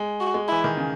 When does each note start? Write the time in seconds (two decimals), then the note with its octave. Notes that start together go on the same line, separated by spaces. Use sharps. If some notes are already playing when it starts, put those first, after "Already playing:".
Already playing: G#3
0.20 F#4
0.34 G#3
0.48 E4
0.52 E3
0.64 D#3
0.77 C#3